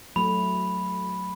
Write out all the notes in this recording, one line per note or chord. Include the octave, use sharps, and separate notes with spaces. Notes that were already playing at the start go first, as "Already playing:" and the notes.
F#3 A3 B5